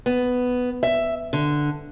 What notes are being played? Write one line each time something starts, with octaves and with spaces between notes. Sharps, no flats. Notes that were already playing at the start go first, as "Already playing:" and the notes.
B3
E5
D3